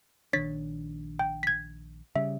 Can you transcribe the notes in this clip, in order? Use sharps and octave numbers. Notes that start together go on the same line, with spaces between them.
A#1 D#3 D4 C#5 A6 B6
G5
G#6 B6
C#3 G3 E5